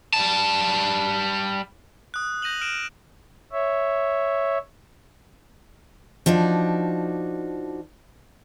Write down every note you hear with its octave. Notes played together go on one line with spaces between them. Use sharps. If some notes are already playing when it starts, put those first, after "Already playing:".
G3 A5
D#6 F#6
G6 A#6 D#7 F7 F#7
F6 D7 E7
C#5 E5
F3 D4 D#4 F#4